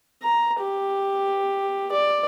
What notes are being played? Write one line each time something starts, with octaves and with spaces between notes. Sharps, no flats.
A#5
G4
D5